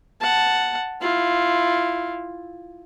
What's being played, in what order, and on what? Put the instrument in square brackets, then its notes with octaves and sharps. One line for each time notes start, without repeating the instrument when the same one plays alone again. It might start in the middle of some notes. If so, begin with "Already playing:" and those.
[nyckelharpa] F#5 A5
E4 F4